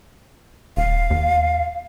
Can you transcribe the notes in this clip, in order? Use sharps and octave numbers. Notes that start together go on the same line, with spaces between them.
D#1 F5
D#2